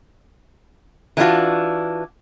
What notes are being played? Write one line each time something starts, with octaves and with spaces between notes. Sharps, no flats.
E3 G#3 B3 D4 F4 F#4